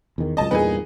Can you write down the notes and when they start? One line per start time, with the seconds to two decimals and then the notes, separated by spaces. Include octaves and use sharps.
0.18 E2 D#3
0.37 C#2 F#2 D#5 A5
0.51 E2 G2 A#2 B3 D#4 G#4